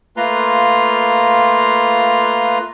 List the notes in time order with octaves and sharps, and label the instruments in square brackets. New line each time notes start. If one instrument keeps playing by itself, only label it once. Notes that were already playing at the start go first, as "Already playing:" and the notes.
[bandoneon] A3 A#3 F4 B4 A#5 C6